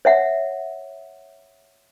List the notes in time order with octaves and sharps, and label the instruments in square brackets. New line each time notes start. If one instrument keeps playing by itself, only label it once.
[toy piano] C#5 E5 F#5